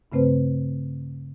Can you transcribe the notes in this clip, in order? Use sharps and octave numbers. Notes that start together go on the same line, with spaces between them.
G2 C#3 A3 C4 B4 C5